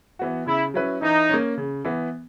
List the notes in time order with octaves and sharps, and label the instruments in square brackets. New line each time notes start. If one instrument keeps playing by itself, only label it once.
[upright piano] E3 B3 F#4
[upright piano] C#3 [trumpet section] E4
[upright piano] F#3 C#4 E4 B4
[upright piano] E3 [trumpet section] D#4
[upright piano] A#3 C#4
C#3
E3 B3